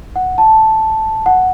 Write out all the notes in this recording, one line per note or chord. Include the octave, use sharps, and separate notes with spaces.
F#5
A5
F#5